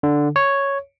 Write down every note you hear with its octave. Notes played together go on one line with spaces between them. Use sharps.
D3
C#5